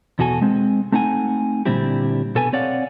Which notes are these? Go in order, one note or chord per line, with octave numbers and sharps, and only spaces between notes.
E2 B2 F#4 A4 G#5
G#3 C4
A3 C4 D#4 F#5 G#5
A#2 D3 G3 C4 E4 G4
B2 A4 B4 G#5
C4 C#5 D5 F5 F#5